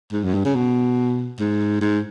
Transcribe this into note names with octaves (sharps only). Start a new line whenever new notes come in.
G#2
F#2
G2
C#3
B2
G#2
G#2